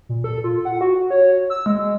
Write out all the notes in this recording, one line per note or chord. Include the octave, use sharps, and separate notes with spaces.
A#2
A4
F4
F#5
F#4
C#5
E6
G#3